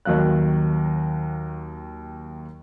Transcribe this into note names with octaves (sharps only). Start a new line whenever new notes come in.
D#2 D#3 F#3 F5 F#6